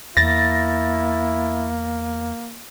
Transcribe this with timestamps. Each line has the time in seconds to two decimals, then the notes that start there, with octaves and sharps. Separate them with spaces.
0.17 E2 A#3 E4 A6 A#6